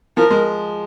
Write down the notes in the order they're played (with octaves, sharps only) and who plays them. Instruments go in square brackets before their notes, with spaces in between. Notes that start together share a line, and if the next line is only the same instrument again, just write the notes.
[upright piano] F3 [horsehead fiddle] A#4
[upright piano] G#3